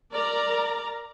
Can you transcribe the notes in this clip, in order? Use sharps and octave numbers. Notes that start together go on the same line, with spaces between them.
A#4 D5 A#5